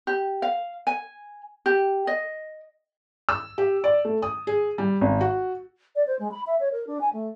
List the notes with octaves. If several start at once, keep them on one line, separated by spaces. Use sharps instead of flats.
G4
F5
G#5
G4
D#5
E6
G4
D5
A3
D#6
G#4
G3
G#1
F#4
D5
C5
G#3
B5
E5
C#5
A#4
D4
G#5
A3